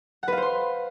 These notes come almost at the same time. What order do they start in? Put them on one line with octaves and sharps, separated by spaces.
F#5 B4 F5 C5 C6